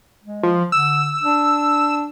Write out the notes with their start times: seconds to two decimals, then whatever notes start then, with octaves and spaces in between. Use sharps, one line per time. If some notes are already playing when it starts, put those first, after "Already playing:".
0.24 G#3
0.43 F3
0.72 D3 E6
1.23 D4